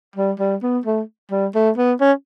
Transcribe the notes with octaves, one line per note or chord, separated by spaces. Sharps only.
G3
G3
B3
A3
G3
A3
B3
C#4